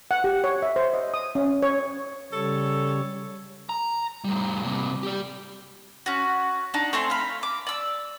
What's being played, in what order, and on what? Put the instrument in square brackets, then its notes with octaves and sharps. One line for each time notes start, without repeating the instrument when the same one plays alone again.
[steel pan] F#5
G4
C#5
E5
C5
D#5
D#6
C#4
C#5
[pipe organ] C#3 G3 C#5 [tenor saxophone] A4
[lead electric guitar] A#5
A2 G3
C3 A#3
G4 D5
[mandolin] C#4 F#4
D4 D#4
A3 C4 G#5 C6
F5 B5
D6
D5 E6